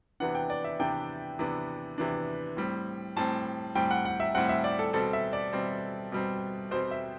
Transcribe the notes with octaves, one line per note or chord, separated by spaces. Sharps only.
C3 E3 B3 D4 F#5
G5
D5
E5
C3 E3 B3 D4 G5
C3 E3 B3 D4
C3 E3 B3 D4
A2 G3 C4
A2 G3 C4 A5
A2 G3 C4 G5
F#5
F#5
E5
A2 G3 C4 F#5
E5
D5
A4
B2 G3 C4 A4
E5
D5
B2 G3 C4
B2 G3 C4
B2 G3 C4 C5
E5